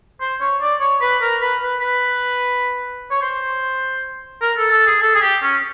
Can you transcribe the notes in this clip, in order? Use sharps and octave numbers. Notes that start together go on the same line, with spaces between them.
C5
C#5
D5
C#5
B4
A#4
B4
B4
B4
C#5
C5
A#4
A4
A4
G#4
A4
G#4
G4
C#4